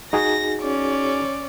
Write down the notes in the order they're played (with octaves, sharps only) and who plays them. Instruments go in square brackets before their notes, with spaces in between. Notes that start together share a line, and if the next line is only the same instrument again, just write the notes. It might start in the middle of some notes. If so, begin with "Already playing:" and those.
[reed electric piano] D#4 F#4 G#4 [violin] A#6
[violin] C#4 D5